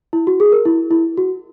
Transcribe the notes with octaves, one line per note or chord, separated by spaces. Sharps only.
E4
F#4
G#4
A#4
E4
E4
F#4